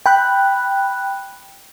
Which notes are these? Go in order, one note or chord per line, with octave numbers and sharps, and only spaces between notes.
G5 B5 F#6